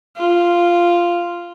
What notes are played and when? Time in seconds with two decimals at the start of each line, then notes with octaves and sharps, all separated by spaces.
0.17 F4